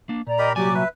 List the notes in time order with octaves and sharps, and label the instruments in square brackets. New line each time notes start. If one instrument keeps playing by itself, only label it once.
[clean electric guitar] A#3 D4
[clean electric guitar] A#2 [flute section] D5 A#5
[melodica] G4 A#4 B5 [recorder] D#5
[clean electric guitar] C2 A#2 G#5 [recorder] F#3 [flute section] G4 D6 [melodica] D5
[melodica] B4 [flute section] E5